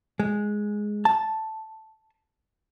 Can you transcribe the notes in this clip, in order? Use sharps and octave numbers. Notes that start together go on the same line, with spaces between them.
G#3
A5